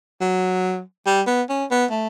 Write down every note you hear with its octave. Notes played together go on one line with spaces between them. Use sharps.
F#3
G3
B3
C#4
B3
A3